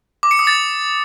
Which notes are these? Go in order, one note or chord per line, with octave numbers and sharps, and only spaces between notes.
D6
C#7
D#6
A6